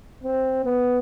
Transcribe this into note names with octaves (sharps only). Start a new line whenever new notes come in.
C4
B3